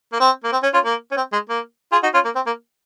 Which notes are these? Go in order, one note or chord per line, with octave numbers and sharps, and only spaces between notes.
A#3
C4
A#3
C4
C#4
C#4 F4
A#3
C#4
C4
G#3
A#3
F4 G#4
D#4 F#4
C#4 F4
A#3
C4
A#3